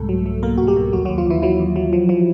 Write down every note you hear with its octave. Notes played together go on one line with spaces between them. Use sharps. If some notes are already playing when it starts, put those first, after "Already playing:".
Already playing: C2 G#2 A3 A4
F#3
F#3
B2 A#3 A#4
C2 F#4
G3 G4
B2
D#2 F#3 F#4
D#2 F#3 F#4
F3 F4
D#2 E3 E4
E3 F#3 E4
D#2
F#3
F3
F3